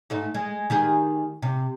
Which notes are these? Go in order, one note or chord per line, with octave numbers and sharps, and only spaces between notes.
G#2 A3 D#4
G#3
D#3 G4 G#4
C3